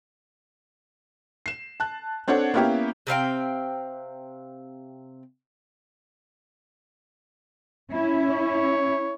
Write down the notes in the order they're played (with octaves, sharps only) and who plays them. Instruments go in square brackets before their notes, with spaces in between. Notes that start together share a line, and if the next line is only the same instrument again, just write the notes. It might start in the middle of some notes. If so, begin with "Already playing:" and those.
[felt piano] C7 E7
A5 F#6
C4 D4 A4 C#5 F#5
A#3 B3 C#4 E4 G4 F5
[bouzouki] C3 C4 F5 G5
[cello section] C#4 E4
[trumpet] C#5